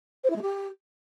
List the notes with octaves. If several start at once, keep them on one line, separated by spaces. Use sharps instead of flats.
C5
E4
G#3
G4